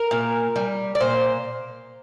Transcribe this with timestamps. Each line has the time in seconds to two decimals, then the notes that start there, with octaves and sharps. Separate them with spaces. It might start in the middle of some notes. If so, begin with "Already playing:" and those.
Already playing: A#4
0.11 A#2
0.56 G3
0.95 D5
1.00 A#2 C5